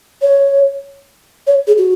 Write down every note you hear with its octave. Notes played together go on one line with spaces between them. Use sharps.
C#5
C#5
G#4
F#4